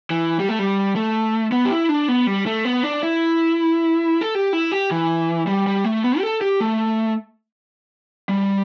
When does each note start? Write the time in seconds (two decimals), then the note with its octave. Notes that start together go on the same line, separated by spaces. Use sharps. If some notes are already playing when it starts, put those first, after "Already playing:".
0.10 E3
0.40 G3
0.49 A3
0.59 G3
0.96 A3
1.52 B3
1.65 G4
1.71 E4
1.89 D4
2.08 B3
2.27 G3
2.46 A3
2.65 B3
2.83 D4
3.03 E4
4.21 A4
4.35 G4
4.53 E4
4.72 G4
4.91 E3
5.47 G3
5.67 G3
5.84 A3
6.04 B3
6.18 G4
6.23 A4
6.41 G4
6.61 A3
8.29 G3